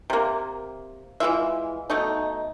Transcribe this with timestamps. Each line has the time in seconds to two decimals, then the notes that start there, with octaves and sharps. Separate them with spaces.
0.10 C3 A#3
1.20 E3 G#3 F4 E5
1.90 B2 A3 D#4